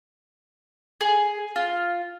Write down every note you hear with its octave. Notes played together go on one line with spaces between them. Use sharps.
G#4
F4